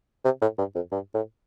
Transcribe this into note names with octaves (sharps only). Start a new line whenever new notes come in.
C3
A2
G2
F2
G2
A2